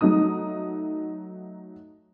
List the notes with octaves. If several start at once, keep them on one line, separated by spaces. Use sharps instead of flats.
F#3 A3 D#4 D#6